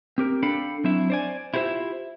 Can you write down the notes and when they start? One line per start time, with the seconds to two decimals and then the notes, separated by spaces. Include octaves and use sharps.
0.18 C4 G4 A#4
0.43 D4 A4 F5 G5 B5
0.84 F#3 C4 D4 E4 E5
1.10 C5 D5 G#5
1.54 E4 F4 G4 B4 C5 E5